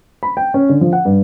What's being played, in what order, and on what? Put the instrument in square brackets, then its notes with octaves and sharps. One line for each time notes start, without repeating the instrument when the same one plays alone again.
[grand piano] B5
G5
C#4
D3
F3
F#5
G2